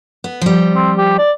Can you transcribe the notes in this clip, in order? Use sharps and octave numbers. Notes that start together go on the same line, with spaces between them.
B3
F3 G3
C4
G4
D5